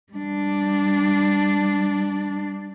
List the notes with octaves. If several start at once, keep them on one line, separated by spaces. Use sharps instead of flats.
G3 D4